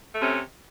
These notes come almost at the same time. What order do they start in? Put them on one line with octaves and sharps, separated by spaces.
A3 C3 C#4